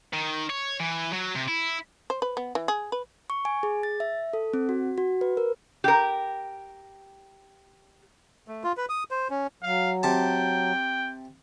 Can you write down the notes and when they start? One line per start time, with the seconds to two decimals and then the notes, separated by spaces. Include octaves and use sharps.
0.13 D#3
0.50 C#5
0.80 E3
1.13 F#3
1.35 C3
1.48 E4
2.10 C5
2.22 B4
2.37 B3
2.55 E3
2.68 G#4
2.92 B4
3.30 C#6
3.45 G#5
3.63 G#4
3.83 A6
4.00 E5
4.33 A4
4.54 C4
4.69 F#4
4.98 F#4
5.21 B4
5.37 A#4
5.84 G4 A#4
8.48 A3
8.64 F4
8.77 B4
8.89 D#6
9.11 C5
9.30 C#4
9.63 F#3 F5
10.03 C3 G5 A5